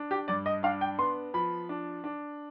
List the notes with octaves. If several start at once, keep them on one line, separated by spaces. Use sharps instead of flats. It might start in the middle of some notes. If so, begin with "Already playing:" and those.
Already playing: D4
G4
G2 D5
D#5
D4 F5
G5
B3 C6
F3 B5
D4
D4